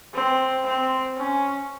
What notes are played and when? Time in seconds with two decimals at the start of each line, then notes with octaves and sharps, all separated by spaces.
0.14 C4
0.64 C4
1.16 C#4